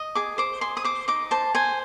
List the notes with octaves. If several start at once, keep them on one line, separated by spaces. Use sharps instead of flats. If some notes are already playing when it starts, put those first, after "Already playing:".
Already playing: D#5
G#4 D6
C5 D6
G#4 C6
D#6
C5 D6
D#4 D6
C5 A5
C5 G#5